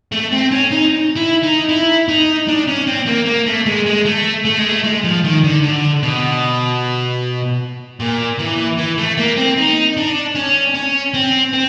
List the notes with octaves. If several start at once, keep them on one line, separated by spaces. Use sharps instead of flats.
A3
C4
C#4
D#4
E4
D#4
E4
D#4
D4
C#4
C4
A#3
A#3
A3
G#3
G#3
A3
A3
G#3
A3
G#3
F3
D#3
D3
D3
B2
A#2
E3
E3
A3
A#3
C4
D#4
D4
C#4
C#4
C4
C4